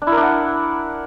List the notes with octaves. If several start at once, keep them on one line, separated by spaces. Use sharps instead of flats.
D4
E4
A#4
D4
F#5